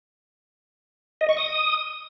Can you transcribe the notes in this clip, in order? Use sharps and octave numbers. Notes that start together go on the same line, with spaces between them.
D#5
C#6
D#6